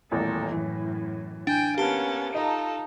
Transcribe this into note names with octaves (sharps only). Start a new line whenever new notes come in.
D#1 A1 E2 A4 A#4
F#2 A2 E3
D4 G5 G#5
A#3 B3 C#4 G4 A5 A6
D#4 F4 A4 D#5 A#5